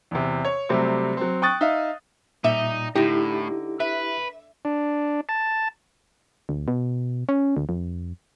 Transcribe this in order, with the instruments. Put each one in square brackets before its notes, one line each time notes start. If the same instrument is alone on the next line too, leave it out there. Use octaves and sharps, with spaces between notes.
[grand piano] E2 C3
C#5
C3 F#3 G3 A3 C4
F#3 C4
G5 C#6 D#6 F#6 A6
D#4 E5 F5
[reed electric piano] A#2 [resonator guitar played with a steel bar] G3 E5 [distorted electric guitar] D#4
[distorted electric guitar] A2 [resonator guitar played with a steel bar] D3 D#4 [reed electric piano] E4 G4
[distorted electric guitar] B4 [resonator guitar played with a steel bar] E5
[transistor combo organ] D4
A5
[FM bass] D2
B2
C#4
D2
F2